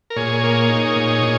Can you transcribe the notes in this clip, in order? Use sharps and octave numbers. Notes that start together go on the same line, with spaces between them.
A#4
A#2 G#4 C#5
A#3
D#4
A#2
A#2